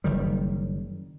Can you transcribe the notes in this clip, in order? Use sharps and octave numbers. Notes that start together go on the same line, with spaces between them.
F#1 D#3 G3